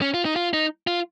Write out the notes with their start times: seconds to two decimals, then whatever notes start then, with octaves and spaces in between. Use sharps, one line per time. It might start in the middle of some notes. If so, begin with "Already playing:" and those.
0.02 C#4
0.14 F4
0.25 D#4
0.36 F4
0.53 D#4
0.87 F4